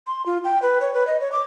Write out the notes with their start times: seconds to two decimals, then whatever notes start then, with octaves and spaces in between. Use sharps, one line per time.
0.07 C6
0.26 F4
0.44 G5
0.62 B4
0.81 C#5
0.94 B4
1.07 D#5
1.20 C#5
1.32 D6